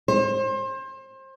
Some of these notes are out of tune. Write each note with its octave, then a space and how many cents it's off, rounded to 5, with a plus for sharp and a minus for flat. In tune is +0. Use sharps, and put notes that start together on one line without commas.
C5 +30